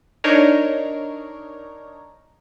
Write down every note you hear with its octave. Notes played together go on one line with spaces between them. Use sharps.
D4 D#4 A#4 C#5